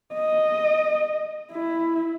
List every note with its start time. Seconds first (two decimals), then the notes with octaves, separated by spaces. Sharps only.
0.14 D#5
1.52 E4